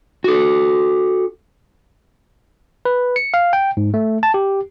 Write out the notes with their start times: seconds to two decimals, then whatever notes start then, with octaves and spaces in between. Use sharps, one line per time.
0.24 F#4 A4
2.85 B4
3.16 C#7
3.34 F5
3.53 G5
3.77 G#2
3.94 A3
4.23 A5
4.34 G4